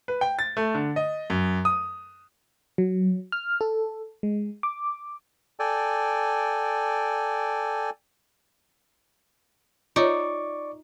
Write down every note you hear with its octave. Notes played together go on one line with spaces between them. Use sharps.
B4
G5
A6
A3
D3
D#5
F#2
D#6
F#3
F6
A4
G#3
D6
A4 D5 G5 G#5
D#4 F4 C#5 D5 C#6 D6